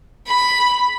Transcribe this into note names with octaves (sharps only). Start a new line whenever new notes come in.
B5